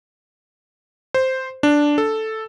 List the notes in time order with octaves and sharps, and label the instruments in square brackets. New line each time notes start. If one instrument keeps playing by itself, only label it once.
[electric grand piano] C5
D4
A4